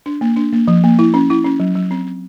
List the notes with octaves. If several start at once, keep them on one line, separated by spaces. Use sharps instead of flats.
D4
A#3
D4
A#3
F3
A#3
E4
C#4
E4
C#4
F#3
F#3
C4
C4